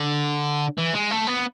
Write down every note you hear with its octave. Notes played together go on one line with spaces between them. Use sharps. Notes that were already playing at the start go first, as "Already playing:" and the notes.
Already playing: D3
E3
G#3
A3
B3